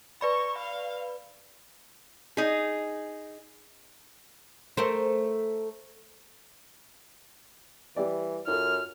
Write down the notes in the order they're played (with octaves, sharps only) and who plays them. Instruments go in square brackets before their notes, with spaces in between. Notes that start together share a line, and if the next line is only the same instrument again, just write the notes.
[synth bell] B4 D5 B5 [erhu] C#6
[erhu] F5
[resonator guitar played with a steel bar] D#4 G#4
[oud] A3 A#4 C5
[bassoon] E3 [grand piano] G3 G4 D5
[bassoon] F#2 [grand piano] F4 A4 [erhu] F6